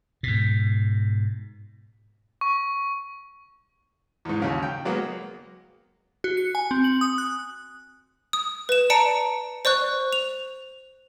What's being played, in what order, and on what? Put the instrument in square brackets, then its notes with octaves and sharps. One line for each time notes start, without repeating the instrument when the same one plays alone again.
[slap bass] G#2 B2
[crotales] C#6
[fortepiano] E2 G#2
D#2 C#3 F#3
G5
F#3 G#3 A#3 B3
[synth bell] F#4
C#7
G#5
C4
F#7
D#6
F#6
[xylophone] D#6
B4 E7
D5 A5 A#5 C#7 D7
C5 D5 C#6 F#6
F7